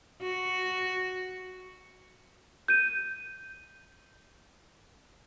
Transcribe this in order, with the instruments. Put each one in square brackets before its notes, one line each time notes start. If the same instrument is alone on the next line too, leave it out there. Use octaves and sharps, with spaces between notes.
[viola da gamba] F#4
[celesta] G6 D#7